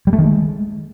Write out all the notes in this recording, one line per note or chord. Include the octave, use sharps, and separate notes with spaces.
G3
A3
D#3
G#3